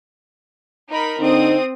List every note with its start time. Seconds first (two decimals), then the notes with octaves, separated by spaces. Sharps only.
0.90 D#4 A#4 B5
1.19 D3 C4 D4 D#4 D#6